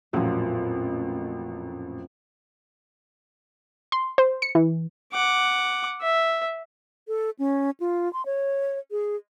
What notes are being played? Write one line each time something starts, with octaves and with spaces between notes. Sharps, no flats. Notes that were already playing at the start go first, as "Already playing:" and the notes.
A1 F2 A#2 F#3
C6
C5
C#7
E3
F#5 D6
E5
A4
C#4
F4
C6
C#5
G#4